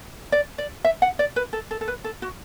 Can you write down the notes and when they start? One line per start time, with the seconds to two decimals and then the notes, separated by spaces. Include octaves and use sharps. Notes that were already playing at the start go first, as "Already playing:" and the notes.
0.32 D5
0.58 D5
0.84 E5
1.02 F#5
1.19 D5
1.36 B4
1.53 A4
1.71 A4
1.81 A4
1.88 B4
2.04 A4
2.22 F#4